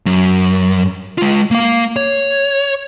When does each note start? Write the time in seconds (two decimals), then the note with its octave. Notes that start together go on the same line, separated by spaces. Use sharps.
0.06 F#2
1.18 G#3 F4
1.51 A#3 F5
1.96 C#5